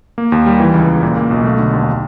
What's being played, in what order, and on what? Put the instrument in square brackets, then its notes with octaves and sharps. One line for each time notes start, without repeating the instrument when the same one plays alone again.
[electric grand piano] A#3
D#2
G3
E3
C#2
C#2
A#2
A#3
B1
A3
D3
D#2